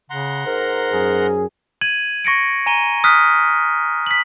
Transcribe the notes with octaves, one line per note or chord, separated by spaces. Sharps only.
C#3 F#5 A#5 C6
G#2 A#4
F#2 G#4
G#6 D#7 F#7
C#6 A#6 C#7 D7
G#5 A#5 D#7 G7
D#6 F6 F#6 B6
B6 F#7